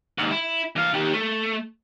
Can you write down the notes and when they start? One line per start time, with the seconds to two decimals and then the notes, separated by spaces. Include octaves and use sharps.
0.18 D#2 G#2
0.31 E4
0.76 E3 F5
0.94 D#3 G4
1.14 A3